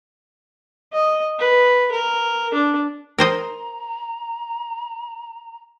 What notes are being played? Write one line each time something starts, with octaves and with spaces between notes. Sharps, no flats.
D#5
B4
A#4
D4
A#4 C5 D#5 A#5